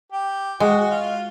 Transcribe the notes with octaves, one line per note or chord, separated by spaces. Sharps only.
G4
G#3 F#4
F#4
F4